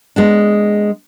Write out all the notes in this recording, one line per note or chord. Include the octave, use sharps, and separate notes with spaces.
G#3 B3 D4